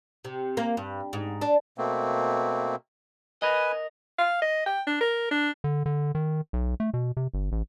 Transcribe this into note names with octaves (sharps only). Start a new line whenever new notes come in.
C3
A#3
G2
G#2
D4
B2 A3 A#3 C4
A#4 B4 D#5 G#5
F5
D#5
G5
D4
A#4
D4
D3
D3
D#3
B1
A3
B2
C3
G1
A1